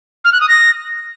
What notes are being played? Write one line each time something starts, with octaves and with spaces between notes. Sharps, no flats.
F6
F#6
D#6
A#6